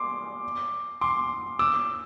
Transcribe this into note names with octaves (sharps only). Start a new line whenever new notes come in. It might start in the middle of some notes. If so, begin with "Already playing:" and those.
Already playing: C6 D6
C6 D6
D6 E6